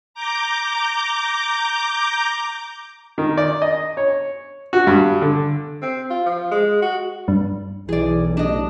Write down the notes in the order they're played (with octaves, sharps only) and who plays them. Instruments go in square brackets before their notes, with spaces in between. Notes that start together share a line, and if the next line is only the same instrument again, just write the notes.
[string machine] A#5 D6 G6
[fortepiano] D#3
D5
D#5
C#5
F#4
G2
D3
[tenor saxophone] C4
F4
F3
G#3
F#4
[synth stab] G2
[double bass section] B1 [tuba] E3 [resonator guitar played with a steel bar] G#4 D5
[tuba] A1 [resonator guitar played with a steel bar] D4 D#5